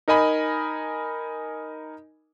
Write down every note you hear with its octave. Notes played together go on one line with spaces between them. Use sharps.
D#4 A#4 D#5 G#5 B5